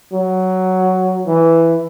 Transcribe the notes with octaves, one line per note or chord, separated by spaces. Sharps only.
F#3
E3